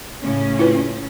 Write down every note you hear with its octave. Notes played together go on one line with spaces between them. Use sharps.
A2 C#3 C#4
E4 F4 B4